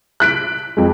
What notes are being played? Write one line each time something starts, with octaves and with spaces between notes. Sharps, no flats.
F#6 B6 D7
F2 G#3